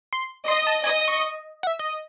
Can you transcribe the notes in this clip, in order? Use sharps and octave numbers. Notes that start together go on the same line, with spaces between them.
C6
D#5 C6
A5
D#5 G#5
C#6
F#5
E5
D#5